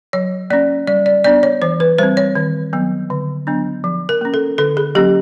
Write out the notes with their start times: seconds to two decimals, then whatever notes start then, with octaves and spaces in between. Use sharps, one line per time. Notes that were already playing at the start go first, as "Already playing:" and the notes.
0.13 F#3 C#5
0.50 A#3 C#4 D5
0.87 G3 D5
1.06 D5
1.24 B3 D4 D5
1.43 C#5
1.62 E3 C5
1.80 B4
1.98 G3 C4 C5
2.17 C#5
2.35 D#3
2.73 F#3 B3
3.10 D3
3.47 F#3 B3 D4
3.84 F3
4.09 A#4
4.21 A#3 C#4
4.34 A4
4.58 D3 A4
4.77 G#4
4.95 F#3 A#3 C#4 G4